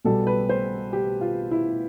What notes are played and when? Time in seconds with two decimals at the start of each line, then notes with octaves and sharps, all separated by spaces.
0.05 B1 B2 G3 A4
0.27 B4
0.49 C5
0.93 G4
1.21 F4
1.51 E4